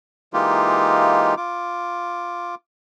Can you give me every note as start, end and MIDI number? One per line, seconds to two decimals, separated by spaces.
0.34 1.35 52
0.34 1.35 56
0.34 1.35 58
0.34 1.35 63
0.34 1.35 65
0.34 1.35 67
1.37 2.55 65
1.37 2.55 86